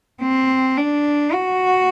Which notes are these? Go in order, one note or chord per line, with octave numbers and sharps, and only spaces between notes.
C4
D4
F#4